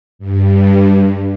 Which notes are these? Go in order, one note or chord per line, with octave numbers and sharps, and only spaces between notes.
G2